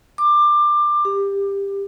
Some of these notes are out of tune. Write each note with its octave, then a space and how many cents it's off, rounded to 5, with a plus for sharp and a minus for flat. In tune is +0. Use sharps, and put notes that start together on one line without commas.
D6 +20
G4 +20